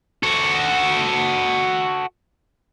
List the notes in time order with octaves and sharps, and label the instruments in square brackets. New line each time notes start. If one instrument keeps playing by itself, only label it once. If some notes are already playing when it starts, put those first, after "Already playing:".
[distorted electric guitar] F#4 A4